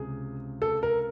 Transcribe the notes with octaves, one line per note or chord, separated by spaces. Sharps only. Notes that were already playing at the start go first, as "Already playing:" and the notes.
Already playing: C#2 C3 G#4
A4
A#4